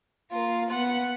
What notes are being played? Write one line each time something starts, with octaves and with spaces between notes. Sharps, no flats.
A#3 F4 A#4
B3 F#5 F#6